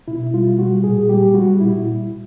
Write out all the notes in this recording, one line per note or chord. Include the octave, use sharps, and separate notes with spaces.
B2 E4
G3 F4
G3 F#4
A#2 G#4
G3 G4
G3 F#4
A#2 E4